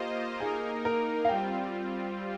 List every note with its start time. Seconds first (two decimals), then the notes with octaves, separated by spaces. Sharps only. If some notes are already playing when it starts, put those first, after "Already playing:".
Already playing: A#3 F4 G4 C5 D#5
0.40 A#3 D#4 G#4 A#4
0.85 A#4
1.25 F5
1.29 G3 C4 F4 G5